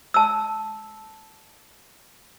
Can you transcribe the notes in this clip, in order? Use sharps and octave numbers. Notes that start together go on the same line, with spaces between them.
A5 E6